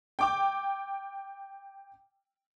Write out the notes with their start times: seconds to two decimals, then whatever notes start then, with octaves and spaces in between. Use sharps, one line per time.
0.19 G5 D6